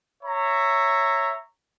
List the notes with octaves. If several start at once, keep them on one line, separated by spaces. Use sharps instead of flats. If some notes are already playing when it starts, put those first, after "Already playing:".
C#5 E5 A#5